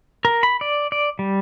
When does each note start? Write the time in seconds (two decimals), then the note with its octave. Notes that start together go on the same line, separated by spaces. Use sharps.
0.25 A#4
0.43 B5
0.61 D5
0.92 D5
1.19 G3